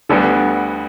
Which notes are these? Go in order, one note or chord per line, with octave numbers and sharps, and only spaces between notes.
D2 D3 G3 B3 D4